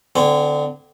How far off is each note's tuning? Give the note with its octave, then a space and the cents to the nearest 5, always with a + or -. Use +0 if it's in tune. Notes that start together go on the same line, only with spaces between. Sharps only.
D3 +0 C4 -40 G#5 -20